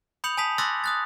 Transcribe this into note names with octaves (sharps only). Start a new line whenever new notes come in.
B5 D#6 G6 C#7 F7 F#7
G#5 A5 D#6 B6 F7
C6 D6 E6 F#6 A6 A#6
D#6 F#6 A6